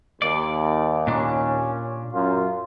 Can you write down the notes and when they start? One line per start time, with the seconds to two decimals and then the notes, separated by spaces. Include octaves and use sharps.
0.22 D#2 D5
1.07 A#2 C#4 D4
2.14 F#2 F4